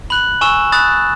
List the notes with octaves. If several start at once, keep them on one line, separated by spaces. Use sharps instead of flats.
B5 F#6 F#7
G#5 C#6 E6 E7
B5 D#6 F#6 A6